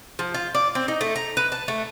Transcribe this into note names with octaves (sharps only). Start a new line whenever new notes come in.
F3
F4
D5
C4
D#4
A3
A#5
B4
A5
A3